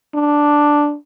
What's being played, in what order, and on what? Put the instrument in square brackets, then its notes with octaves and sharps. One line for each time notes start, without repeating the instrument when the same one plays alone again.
[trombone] D4